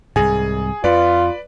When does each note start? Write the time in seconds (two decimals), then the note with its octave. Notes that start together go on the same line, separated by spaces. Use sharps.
0.16 C2 G#2 G#4 G#5
0.84 F2 F4 B4 D5